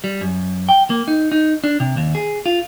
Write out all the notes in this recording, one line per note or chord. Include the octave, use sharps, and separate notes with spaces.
G3
F#2
G5
A#3
D#4
D#4
D4
C3
D#2
G#4
F4